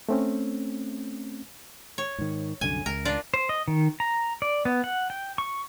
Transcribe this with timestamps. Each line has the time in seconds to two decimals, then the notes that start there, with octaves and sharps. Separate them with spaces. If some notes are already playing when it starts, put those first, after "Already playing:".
0.09 A3 C4 C#4
1.98 C#5
2.18 G#2 D#3
2.61 C2 F#2 D3 G#5
2.86 C#2 A#4
3.05 D4 F4 D5
3.34 C5
3.49 D#5
3.68 D#3
4.00 A#5
4.42 D5
4.65 B3
4.84 F#5
5.10 G5
5.38 C#6